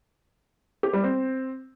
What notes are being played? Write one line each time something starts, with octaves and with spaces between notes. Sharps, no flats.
G4
G3
C4